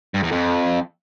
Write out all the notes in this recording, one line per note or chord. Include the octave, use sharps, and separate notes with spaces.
G2
E2
F2